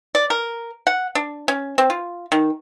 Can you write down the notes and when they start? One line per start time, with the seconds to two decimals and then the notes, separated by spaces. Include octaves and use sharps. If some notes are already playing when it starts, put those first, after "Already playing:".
0.15 D5
0.30 A#4
0.87 F#5
1.15 D4
1.48 C#4
1.78 C4
1.90 F4
2.32 D#3